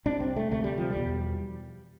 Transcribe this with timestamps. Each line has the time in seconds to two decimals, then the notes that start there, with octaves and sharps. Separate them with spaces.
0.06 C2 C3 D4
0.20 C4
0.36 A3
0.51 D2 C3 A3
0.64 G3
0.78 F3
0.90 G3
0.96 E2 B2